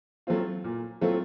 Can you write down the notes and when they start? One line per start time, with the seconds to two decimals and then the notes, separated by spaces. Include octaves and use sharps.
0.27 F#3 A3 C4 F4
0.64 A#2
1.01 F#3 A3 C4 F4